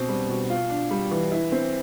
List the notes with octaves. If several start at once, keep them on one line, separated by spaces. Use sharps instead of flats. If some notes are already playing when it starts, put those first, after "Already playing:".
Already playing: B2 C4
G3
B2
F4
D4
G3
E3
E4
C4